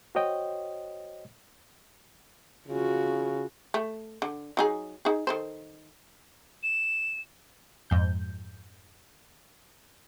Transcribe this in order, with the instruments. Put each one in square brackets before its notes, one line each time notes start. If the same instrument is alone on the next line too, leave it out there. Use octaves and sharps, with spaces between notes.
[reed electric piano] F#4 C5 C#5 D#5 G5
[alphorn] C#3 [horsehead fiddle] F4 F#4
[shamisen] A3
D3
F#3 D#4 G#4
D#4 G#4
D#3 A4 C5
[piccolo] E7
[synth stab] F2 G#2 G6